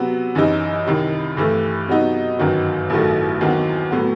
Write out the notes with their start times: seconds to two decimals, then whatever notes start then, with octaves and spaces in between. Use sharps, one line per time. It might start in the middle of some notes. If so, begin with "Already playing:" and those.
Already playing: C3 F#3 B3
0.35 F#2 E3 G3 D#4
0.86 C2 C3 D#3 G3
1.37 G2 E3 A3
1.88 C3 F#3 B3 D#4
2.39 G1 F#2 D#3 F#3
2.90 A1 G2 D#3 F#3 A3
3.41 E2 D#3 F#3 C4 F#4
3.91 A2 F#3 B3